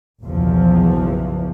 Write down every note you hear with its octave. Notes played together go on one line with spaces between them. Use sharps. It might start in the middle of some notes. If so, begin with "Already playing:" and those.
F#1 B1 E2 E3 F3